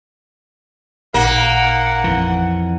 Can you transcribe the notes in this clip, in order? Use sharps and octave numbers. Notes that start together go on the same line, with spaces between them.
A1 A#2 A#3 D#4 F#5
F2 E3